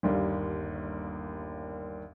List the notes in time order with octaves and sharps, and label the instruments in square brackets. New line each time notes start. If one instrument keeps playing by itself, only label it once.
[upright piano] G1 D#2 G3 A#3